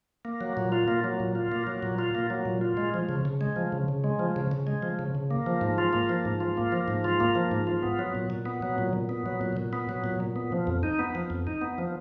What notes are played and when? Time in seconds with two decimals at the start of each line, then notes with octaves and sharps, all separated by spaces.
0.25 A#3
0.41 F#3
0.57 A#2
0.72 F4
0.88 A#3
1.04 F#3
1.20 A#2
1.35 F4
1.52 A#3
1.67 F#3
1.83 A#2
1.99 F4
2.15 A#3
2.30 F#3
2.45 A#2
2.61 F4
2.77 G#3
2.94 F3
3.09 C#3
3.25 C#3
3.41 G#3
3.56 F3
3.72 C#3
3.88 C#3
4.04 G#3
4.19 F3
4.36 C#3
4.51 C#3
4.67 G#3
4.83 F3
4.99 C#3
5.15 C#3
5.31 A#3
5.46 F3
5.61 G#2
5.78 F4
5.93 A#3
6.09 F3
6.25 G#2
6.40 F4
6.57 A#3
6.72 F3
6.88 G#2
7.04 F4
7.20 A#3
7.35 F3
7.51 G#2
7.67 F4
7.83 B3
7.99 F#3
8.15 A#2
8.30 A#2
8.46 B3
8.62 F#3
8.78 A#2
8.93 A#2
9.09 B3
9.26 F#3
9.41 A#2
9.57 A#2
9.73 B3
9.89 F#3
10.04 A#2
10.20 A#2
10.36 B3
10.52 F3
10.67 F2
10.83 D#4
10.99 B3
11.15 F3
11.30 F2
11.47 D#4
11.61 B3
11.78 F3